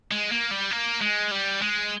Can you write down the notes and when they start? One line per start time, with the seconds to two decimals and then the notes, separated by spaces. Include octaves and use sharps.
0.11 G#3
0.32 A#3
0.51 G3
0.71 A#3
1.01 G#3
1.31 G3
1.61 G#3